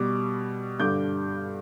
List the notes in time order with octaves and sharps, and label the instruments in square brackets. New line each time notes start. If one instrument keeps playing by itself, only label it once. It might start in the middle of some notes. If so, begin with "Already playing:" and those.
Already playing: [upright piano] B2 G3 D6
G2 D3 G3 D6 G6